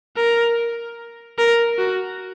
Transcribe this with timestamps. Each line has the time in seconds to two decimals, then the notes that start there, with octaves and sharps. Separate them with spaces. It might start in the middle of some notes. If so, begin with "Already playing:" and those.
0.17 A#4
1.38 A#4
1.78 F#4